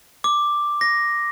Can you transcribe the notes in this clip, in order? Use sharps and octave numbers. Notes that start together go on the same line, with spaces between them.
D6
A#6